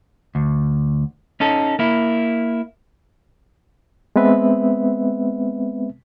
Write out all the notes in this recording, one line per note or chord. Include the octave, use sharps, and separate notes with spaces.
D2
C#4 D#4 A4
A#3 E4
G#3 B3 C4 B4 E5